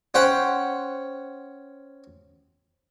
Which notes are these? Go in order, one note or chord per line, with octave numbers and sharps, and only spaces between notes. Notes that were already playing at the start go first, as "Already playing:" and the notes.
C#4 C5 F#5 G5